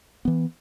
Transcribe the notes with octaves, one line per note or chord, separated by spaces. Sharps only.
E3 B3